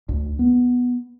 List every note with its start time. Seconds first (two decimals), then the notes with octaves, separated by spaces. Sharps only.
0.09 D2
0.39 B3